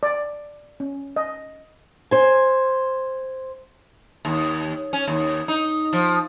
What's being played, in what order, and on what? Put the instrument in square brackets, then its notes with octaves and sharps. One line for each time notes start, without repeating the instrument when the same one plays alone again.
[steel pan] D5
C#4
D#5
[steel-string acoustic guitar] C5 G#5
[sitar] D#2
C#4
D#2
D#4
F3